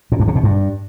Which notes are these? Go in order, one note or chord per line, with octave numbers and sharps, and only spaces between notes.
A#2
G2
C3
B2
G2